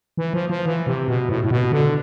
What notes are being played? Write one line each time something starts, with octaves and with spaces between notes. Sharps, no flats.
E3
F3
F3
E3
C3
B2
A2
A2
B2
D3